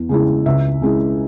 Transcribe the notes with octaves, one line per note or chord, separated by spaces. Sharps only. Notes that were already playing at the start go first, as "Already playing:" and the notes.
Already playing: E2
C#3 G#3 E4
C#2 E5
C#3 G#3 E4